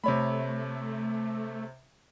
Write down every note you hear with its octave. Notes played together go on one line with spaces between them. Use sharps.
C3 A3 C#5 B5